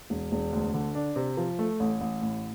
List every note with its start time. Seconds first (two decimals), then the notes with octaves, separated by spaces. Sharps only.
0.10 E1
0.32 E1
0.53 D2
0.74 D3
0.95 D4
1.16 C3
1.37 F3
1.59 A3
1.80 A1
2.01 A1
2.22 A2